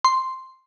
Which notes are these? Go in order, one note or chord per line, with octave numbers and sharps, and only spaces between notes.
C6